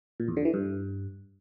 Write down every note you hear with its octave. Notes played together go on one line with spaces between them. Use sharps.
A#2
E2
D3
E3
G2